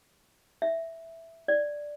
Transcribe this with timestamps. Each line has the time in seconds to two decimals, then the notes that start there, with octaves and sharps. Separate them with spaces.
0.62 E5
1.48 D5